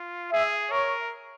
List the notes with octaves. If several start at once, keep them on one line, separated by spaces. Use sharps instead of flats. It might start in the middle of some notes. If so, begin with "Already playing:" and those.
Already playing: F4
G#4 E5
A#4 C#5